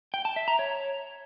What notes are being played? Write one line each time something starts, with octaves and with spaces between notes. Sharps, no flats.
G5
A5
E5
A#5
C#5